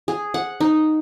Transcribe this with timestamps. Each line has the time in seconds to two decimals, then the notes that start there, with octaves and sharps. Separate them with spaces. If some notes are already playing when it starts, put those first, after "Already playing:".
0.08 G#4
0.34 F#5
0.60 D#4